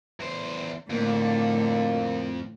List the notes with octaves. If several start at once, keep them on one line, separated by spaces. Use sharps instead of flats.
E2 C5
F2 A2 D3 A#3